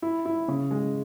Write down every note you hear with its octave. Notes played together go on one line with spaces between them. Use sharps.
E4
E4
C#3
G#3